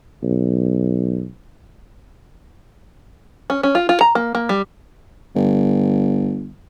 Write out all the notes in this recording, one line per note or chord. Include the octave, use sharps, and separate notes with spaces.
B1
C#4
C#4
F4
F4
A#5
A#3
A#3
G3
G1